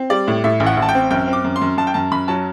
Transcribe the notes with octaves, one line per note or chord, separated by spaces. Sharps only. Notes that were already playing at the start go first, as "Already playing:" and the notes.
Already playing: C4
G3 D5
A2
A2 E5
A1
F#5
A1
A5
G5
C4
F#2 G5
C4
D6
F#2
C6
F#2
F#2 A5
G5
F#2 A5
F#2 B5
F#3 A5